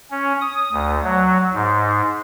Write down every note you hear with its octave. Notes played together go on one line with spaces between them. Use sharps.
C#4
D#6
D2
F#3
G#2